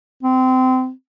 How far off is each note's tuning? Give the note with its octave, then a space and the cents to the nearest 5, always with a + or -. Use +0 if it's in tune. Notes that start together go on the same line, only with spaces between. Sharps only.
C4 -25